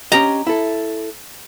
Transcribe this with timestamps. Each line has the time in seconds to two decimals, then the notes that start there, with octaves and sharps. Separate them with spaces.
0.12 C#4 G4 D#5 A#5
0.47 E4 A4